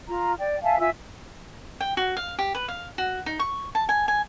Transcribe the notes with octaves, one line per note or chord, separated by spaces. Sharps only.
F4 A#5
D5 G5
E5 F5 G#5 A5
F4 E5 G#5 E6
G5
F#4
F5
G4
B4
F5
F#4
D#4
C#6
A5
G#5
G#5